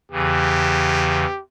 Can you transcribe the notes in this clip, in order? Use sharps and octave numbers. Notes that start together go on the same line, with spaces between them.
E2 C#3 E3 G4